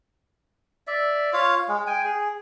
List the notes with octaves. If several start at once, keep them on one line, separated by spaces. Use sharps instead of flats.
D5 E5
F4 C#5 F5
G#3
G5 G#5
G#4